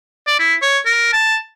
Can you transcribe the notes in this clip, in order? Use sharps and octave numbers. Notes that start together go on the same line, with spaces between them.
D5
E4
C#5
A#4
A5